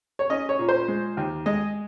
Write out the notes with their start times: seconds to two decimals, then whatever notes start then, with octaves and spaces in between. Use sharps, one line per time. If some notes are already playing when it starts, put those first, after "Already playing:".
0.19 C#5
0.30 C#4 D#5
0.49 C#5
0.59 A#2
0.69 C5
0.88 G#3
1.17 D#2
1.46 G#3 D#5